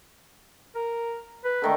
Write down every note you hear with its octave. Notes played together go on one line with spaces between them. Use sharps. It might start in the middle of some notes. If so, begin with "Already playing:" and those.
A#4
B4
D3 D#3 A3